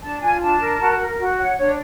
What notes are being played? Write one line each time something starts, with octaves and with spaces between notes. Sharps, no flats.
D4 A5
F4 G#5
D4 A5
A#4
F#4
A#4
F#4
C#5 F#5
D4 C#5